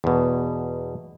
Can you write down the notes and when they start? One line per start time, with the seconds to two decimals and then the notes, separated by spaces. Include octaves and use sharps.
0.04 E2 B2